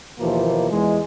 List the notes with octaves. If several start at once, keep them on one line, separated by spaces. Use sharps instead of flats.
D#2 B2 E3 F3 A#3
E2 G#3